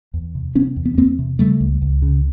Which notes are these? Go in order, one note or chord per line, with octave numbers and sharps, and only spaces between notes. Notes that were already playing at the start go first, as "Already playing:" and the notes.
E2
C3
C3 B3 C#4
E2
B3
E2 A#3 C4
C3
C#3 G3 A3
C#2
C#2
C#3